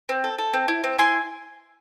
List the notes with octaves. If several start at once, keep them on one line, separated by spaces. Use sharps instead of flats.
C4
A4
A4
C4
E4
C4
E4 G#5 C6